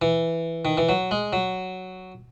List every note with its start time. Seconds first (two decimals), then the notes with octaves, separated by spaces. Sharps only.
0.02 E3
0.65 D#3
0.78 E3
0.89 F#3
1.11 G#3
1.33 F#3